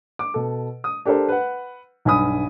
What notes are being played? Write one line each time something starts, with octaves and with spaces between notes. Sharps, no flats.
D6
B2 A4
D#6
D4 G4 A4 A#4 C5
B4 F#5
B1 G2 G#5 B5 D#6